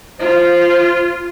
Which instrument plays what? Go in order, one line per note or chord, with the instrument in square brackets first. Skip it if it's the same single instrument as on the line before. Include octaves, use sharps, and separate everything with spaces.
[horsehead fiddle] F4 [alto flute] C5